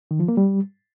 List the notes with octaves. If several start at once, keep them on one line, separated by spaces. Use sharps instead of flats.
D#3
F3
A#3
G3